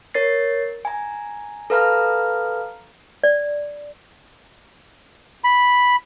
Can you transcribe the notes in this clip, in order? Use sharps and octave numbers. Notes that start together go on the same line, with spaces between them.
A#4 C#5 A6 C7
G#5 A#5
A4 B4 F5 A#5 F6
D5
B5